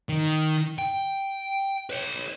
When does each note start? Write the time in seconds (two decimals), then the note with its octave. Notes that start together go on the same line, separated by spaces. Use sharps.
0.09 D#3
0.78 G5
1.90 B4 C#5